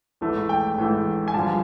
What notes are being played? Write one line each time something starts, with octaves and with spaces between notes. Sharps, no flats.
A1 G#2 E3 A3
G5
A1 G#2 E3 A3
G#5
G2 D3 F3 A5